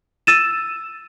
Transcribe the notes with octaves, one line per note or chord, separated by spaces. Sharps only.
E6 A6 D#7 E7